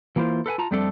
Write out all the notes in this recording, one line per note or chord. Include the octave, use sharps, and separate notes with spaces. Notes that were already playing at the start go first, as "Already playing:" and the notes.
E3 A#3 E4 F4 C5
A4 B4 F#5 G#5
F4 A5 A#5
F2 G3 A3 C4 D4 A4